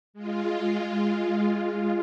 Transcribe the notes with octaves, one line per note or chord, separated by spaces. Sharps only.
G#3 F4